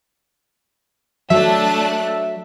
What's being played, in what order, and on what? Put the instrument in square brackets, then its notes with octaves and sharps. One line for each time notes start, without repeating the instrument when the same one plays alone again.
[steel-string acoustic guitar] F#3 [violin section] A3 D4 F#6 [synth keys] E5